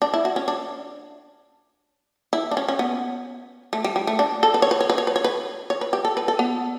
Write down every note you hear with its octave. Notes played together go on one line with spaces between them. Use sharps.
D4
E4
F#4
C#4
D4
E4
D4
C#4
C#4
B3
A3
G3
G3
A3
D4
A4
B4
C#5
B4
C#5
B4
C#5
B4
C#5
B4
C#5
B4
G4
A4
B4
A4
B3